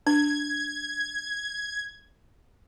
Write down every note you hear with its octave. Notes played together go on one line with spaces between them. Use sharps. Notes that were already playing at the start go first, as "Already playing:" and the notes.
D4 G#6